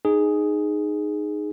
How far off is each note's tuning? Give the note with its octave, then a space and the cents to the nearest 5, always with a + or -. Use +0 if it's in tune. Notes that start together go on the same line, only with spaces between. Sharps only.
D#4 -15 G#4 +0